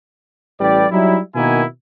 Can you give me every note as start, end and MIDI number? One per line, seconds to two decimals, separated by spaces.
0.60 0.86 33
0.60 0.86 55
0.60 0.86 67
0.60 0.86 71
0.60 0.86 74
0.91 1.18 54
0.91 1.18 55
0.91 1.18 63
0.91 1.18 64
1.36 1.64 47
1.36 1.64 51
1.36 1.64 58
1.36 1.64 59
1.36 1.64 64
1.36 1.64 80